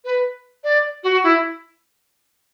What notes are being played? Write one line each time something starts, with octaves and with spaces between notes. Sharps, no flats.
B4
D5
F#4
E4